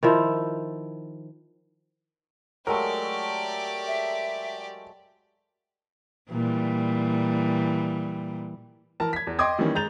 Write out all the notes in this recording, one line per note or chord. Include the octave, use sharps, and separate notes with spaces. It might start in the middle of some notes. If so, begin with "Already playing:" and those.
D#3 F3 E4
F#3 G#3 A3 G4 A#4 D5
E5
A#2 E3 G3
E3 A#4 A5
G#6 B6
E2
D#5 G5 C6 D6 D#6 G#6
D#3 E3 G3 A#3 C#4
G#3 A#5 G6 A6 F7